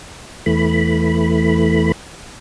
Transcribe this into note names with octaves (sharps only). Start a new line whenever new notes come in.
E2 E3 A3 B5